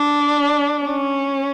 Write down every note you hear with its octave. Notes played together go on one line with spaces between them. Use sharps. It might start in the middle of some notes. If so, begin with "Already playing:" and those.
Already playing: D4
C#4